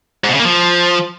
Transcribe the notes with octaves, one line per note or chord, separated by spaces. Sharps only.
G#2
B2
C#3
A#3
F3